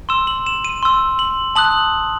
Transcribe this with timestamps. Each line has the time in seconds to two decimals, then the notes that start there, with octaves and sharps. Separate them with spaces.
0.09 C6 E6 E7
0.27 F#7
0.46 E7
0.64 D#7
0.83 C6 E6
1.19 F#7
1.56 A5 D#6 F#6 F#7